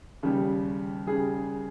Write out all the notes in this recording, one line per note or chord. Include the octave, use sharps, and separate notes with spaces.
D#2 C#3 G3
C#3 G3 G#4